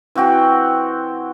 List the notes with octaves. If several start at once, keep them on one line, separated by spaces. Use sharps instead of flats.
E3 C4 F#4 G5